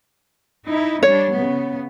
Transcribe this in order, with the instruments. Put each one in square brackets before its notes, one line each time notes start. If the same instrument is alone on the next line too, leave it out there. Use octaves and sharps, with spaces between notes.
[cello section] D#4 E4
[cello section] G3 D4 [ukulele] C#5
[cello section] C#3 B3